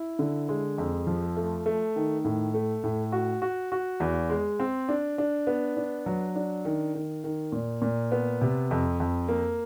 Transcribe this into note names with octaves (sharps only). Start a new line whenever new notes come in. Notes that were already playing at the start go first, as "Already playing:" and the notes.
Already playing: E4
D3
G#3
F2
F3
A3
A3
D#3
A2
A3
A2
F#4
F#4
F#4
E2
G#3
C4
D4
D4
B3
D4
F#3
D4
D#3
D#3
D#3
A#2
A#2
B3
C3
F2
F2
A#3